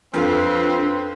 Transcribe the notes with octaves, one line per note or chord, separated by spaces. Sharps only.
F2 C4 D4 A4 B4 F5